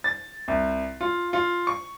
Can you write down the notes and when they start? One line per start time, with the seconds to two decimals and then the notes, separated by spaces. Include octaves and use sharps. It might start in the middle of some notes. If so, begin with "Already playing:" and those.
0.04 A6
0.48 C2
1.01 F4
1.33 F4
1.67 C#6